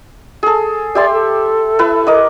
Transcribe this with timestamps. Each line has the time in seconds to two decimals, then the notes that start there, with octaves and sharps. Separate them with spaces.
0.43 G#4 A4
0.95 G4 D5 E5 C6
1.13 A4
1.79 E4 B4 A5
2.07 A#4 D#5 D6